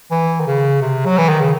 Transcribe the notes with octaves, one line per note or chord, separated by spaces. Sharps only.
E3
D#3
C#3
C3
F#3
E3
D#3
C#3